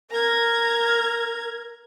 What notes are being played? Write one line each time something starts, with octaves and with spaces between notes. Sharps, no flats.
A#4 A#5 G#6